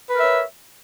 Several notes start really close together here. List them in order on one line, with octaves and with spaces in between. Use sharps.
B4 A#4 E5 C#5